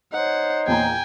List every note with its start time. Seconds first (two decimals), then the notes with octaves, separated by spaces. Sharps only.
0.13 D#4 C5 C#5 F#5
0.67 E2 A#2 G5 G#5 A#5